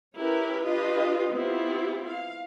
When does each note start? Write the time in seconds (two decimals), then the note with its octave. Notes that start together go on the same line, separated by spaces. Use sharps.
0.16 C#4 E4 G4 A#4 B4
0.65 D4 F4 G4 B4 D#5
1.34 B3 C4 E4 F4 G4
2.10 F5